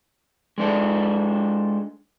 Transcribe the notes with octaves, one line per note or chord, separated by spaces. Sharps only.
G#3 D4 A4